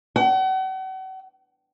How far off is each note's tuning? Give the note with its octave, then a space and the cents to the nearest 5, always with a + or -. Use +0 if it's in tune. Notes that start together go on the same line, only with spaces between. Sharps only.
F#5 +40